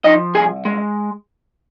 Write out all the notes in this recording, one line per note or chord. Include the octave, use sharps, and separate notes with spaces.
F3 D#4 D#5
C2 G#4 G#5
G#3